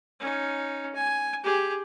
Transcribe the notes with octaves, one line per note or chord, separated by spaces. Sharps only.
C#4 D#4
G#5
G4 G#4